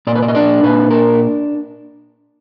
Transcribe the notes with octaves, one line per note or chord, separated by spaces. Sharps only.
A#2 D5
B4
D5
D#5
D4 D5
A#2 B4
D4 A#4